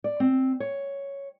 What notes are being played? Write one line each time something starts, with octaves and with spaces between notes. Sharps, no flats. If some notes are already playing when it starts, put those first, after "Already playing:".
D5
C4
C#5